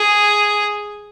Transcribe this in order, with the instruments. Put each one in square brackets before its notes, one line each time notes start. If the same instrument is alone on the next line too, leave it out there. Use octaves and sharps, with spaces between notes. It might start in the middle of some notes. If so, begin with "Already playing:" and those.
Already playing: [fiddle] G#4